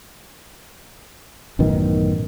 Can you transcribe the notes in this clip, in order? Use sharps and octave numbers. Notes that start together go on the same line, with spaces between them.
A1 F#2 B2 D#3